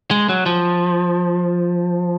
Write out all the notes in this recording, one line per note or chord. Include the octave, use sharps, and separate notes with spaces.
G#3
F#3
F3